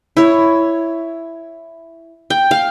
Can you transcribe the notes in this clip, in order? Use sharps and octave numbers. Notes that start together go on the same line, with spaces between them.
E4 C#5
G5
F5